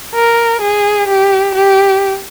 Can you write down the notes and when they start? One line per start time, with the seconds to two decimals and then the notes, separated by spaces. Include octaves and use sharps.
0.15 A#4
0.62 G#4
1.08 G4
1.55 G4